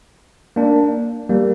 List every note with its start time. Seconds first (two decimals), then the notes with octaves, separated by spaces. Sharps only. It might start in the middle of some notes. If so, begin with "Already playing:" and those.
0.56 A#3 D4
1.29 G3 A#3